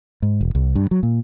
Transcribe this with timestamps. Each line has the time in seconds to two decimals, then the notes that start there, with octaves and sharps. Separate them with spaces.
0.22 G#2
0.41 E1
0.55 C2
0.75 G2
0.91 F#3
1.03 A#2